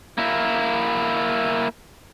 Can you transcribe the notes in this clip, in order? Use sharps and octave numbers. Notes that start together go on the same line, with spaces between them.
A#3 E4